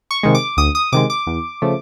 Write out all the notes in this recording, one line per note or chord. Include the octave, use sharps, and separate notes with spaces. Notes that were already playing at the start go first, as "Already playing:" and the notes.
C#6
C3 D#3 G#3
D6
D2 D#6
D#6
C3 D#3 G#3 D6
D6
E2
C#3 F3 A3